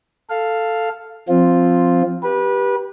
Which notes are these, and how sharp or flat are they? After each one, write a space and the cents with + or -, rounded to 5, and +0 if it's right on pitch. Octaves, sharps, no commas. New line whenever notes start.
A4 +5 F5 +0
F3 +0 C4 +0 F4 +0
G4 +0 B4 -25